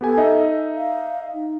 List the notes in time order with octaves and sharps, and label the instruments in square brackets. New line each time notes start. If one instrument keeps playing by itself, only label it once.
[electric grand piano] B3 G4 G#5 [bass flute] A4
[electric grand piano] D#4 D#5 E5
[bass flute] F5
D#4